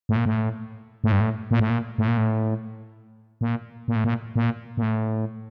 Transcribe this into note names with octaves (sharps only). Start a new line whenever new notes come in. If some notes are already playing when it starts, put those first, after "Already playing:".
A2
A#2
A2
A2
G2
A2
A#2
A2
A#2
A2
A#2
A2
A#2
A#2
A2
A#2
A#2
A#2
A2